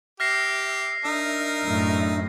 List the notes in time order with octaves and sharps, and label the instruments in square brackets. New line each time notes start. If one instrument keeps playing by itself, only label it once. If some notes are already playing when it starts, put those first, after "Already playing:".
[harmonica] G4 [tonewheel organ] E5 [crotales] F6 A#6 C7
[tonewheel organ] D4 E5 [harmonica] D#4 A#4
[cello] F#2 A2